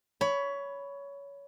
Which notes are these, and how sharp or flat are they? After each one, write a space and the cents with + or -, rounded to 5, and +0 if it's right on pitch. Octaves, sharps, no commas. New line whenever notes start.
C#5 +20 B5 +0